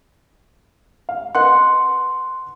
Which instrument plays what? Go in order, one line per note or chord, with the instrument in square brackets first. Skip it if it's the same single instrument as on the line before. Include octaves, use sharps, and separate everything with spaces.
[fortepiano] F5
[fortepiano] B4 D#5 F#5 [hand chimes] C6 F#6